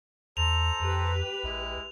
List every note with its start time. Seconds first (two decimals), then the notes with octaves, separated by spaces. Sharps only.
0.37 E2 A4 C5 A#5 F7
0.80 F2 G4 B4
1.43 A#1 G#3 E4